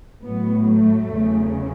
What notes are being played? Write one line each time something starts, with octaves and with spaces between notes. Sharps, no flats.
A2 F#3 B3
A3
E2 C#3 F#3